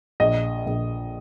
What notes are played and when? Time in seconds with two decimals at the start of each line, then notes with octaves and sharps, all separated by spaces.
0.20 A#1 D#5
0.66 A#1